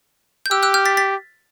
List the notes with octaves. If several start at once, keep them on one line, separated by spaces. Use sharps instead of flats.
G6
G4 E6 F#6
E6 F#6
F6 G6
A6 B6
A6 B6